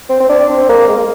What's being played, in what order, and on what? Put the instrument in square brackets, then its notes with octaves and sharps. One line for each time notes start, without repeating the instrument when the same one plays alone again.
[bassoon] C4
C4
D4
C4
A#3
G#3
A#3